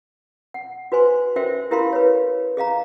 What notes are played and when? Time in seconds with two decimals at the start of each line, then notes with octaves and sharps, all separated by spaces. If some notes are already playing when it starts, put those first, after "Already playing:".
0.54 F#5
0.92 F#4 B4 C5 G#5 C6
1.36 C#4 F#4 A#4 C5 E5 G5
1.71 E4 G4 A#4 F5 B5 C6
1.93 B4 C#5
2.57 G#4 D#5 F5 A#5